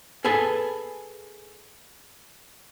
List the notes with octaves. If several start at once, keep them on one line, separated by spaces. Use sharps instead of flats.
G#4 A4 B4 G#5 A5